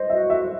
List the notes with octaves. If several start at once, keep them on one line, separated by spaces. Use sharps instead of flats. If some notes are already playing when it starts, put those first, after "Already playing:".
Already playing: C5 D#5
F#4 E5
E5